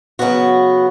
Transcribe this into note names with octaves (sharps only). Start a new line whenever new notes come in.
C#3 F#3 B3 F#4